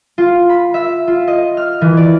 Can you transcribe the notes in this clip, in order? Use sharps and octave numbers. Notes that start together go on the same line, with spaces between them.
F4
B5
E5
F4
D#5
F6
E3
D5